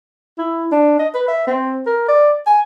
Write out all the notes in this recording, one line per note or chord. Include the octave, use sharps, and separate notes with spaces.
E4
D4
D#5
B4
E5
C4
A#4
D5
G#5